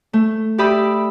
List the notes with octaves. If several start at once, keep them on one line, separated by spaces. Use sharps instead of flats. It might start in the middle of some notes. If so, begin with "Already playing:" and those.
A3
G4 D5 E5 B5 D#6